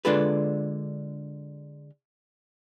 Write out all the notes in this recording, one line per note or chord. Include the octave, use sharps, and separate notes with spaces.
D3 G#3 D4 F4 A4 B4